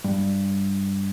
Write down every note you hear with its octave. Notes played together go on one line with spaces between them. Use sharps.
G2